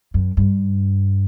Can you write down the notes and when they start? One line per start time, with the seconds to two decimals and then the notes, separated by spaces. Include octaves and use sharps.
0.14 F#2
0.37 G2